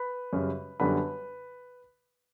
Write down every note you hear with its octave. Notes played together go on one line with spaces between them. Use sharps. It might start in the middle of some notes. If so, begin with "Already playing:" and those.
Already playing: B4 B5
F#2 C#3 G3
F#2 D3 G3 B3 D4 B4 B5